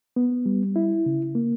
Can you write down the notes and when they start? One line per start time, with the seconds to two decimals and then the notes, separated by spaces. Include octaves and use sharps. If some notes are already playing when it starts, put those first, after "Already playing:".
0.16 B3
0.46 G3
0.76 E4
1.06 C#3
1.35 A#3